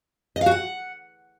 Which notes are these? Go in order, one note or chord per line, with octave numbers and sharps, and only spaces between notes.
D#5
F5
F#4
F#5